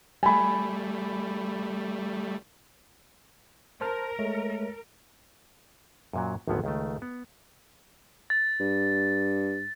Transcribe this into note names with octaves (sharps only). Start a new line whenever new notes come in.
G3 A3 G#5 B5
A#4 C5 A5 F6
G#3 A3 C#5
F#2 A#2 F#3
G#1 D2 A2 F3 F#3 B3
C#2 D#3 A3
B3
A6
G2